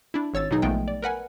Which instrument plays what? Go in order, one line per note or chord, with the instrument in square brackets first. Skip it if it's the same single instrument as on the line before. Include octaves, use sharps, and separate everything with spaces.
[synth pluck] D4 E4
G#1 C#5 E6 A6
B2 F#3 D#4 G#4
A#1 G#3 A3 B3 G5
D5
A#4 B4 F#5 G#5